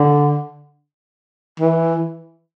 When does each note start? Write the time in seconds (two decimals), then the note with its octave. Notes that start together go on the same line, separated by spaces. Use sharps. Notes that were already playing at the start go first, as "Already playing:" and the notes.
Already playing: D3
1.60 E3